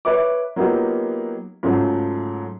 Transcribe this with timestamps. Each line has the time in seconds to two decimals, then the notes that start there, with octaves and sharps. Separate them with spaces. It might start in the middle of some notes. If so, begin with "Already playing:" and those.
0.05 B4 C#5 E5 D6
0.56 F#3 A#3 B3 D#4 F4 G4
1.63 G#2 C#3 F#3 A3 F4